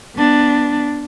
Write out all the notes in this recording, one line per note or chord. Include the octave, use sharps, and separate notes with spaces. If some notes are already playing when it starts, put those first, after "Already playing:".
B3 D4